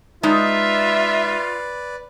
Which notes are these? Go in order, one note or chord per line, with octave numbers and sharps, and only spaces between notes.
G#3 D#4 F4 B4 D5 E5 A#5